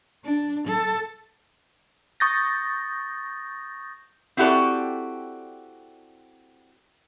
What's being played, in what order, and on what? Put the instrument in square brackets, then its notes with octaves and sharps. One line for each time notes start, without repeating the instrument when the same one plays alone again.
[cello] D4
A4
[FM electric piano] C#6 D#6 G6 A6 A#6
[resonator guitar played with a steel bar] C4 E4 F#4 G4 A4 D5